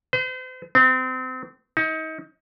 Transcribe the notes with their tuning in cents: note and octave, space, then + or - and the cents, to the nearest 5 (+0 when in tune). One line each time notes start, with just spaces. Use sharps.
C5 -40
C4 -30
D#4 +30